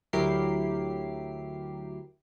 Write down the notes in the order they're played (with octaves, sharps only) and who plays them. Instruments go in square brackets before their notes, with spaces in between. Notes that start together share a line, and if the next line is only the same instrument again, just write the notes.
[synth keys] D2 F#3 E4 G4 A#4 C7